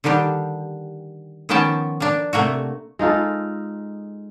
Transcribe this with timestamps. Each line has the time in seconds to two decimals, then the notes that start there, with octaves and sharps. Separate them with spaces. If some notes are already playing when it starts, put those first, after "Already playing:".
0.04 D3 D#3 G3 D4 G4
1.49 D#3 F3 B3 C#4 G5 A5
2.00 A#3 D4
2.33 C3 A3 A#3 F#4
2.99 G#3 D#4 F4 A4